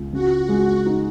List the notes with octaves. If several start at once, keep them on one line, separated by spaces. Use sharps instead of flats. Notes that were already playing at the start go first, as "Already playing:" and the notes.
Already playing: C#2
C#3 F#4
G#3
D#4